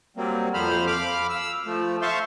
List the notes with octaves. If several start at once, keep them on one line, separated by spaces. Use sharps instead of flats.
F#3 G3 A#3 C4
F2 F3 A3 C5 B5 F6
F5 B5 D6 F6
E6
F3 A3
C5 E5 F5 A5 C6 C#6